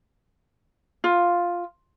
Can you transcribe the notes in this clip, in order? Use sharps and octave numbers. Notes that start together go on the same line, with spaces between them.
F4